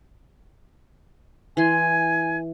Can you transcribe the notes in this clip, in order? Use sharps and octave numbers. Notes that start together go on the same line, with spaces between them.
E3 G#5 C6